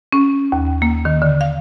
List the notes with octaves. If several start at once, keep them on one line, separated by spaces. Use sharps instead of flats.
C#4
D#2
A#3
D#3
D3
F5